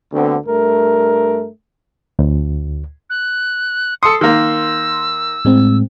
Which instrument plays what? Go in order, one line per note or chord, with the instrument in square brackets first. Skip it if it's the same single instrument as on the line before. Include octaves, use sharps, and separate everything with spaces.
[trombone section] D2 D3 B3 C4
G2 A3 A#4
[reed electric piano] D2
[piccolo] F#6
[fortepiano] A4 D#6 [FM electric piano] C6 [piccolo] C#7
[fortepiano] D#3 A#3 [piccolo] E6
[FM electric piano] A2 G#3 C4